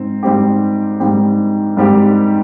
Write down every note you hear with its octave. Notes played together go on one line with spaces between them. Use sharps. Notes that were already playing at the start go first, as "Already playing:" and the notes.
Already playing: G#2 C4
G#2 G3 C4 G4
G#2 G3 C4 G4
G#2 G3 C4 G4